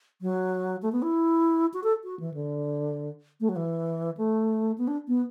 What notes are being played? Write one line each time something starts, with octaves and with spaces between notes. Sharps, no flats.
F#3
A3
B3
E4
F#4
A4
F#4
E3
D3
A3
F#3
E3
A3
B3
D4
B3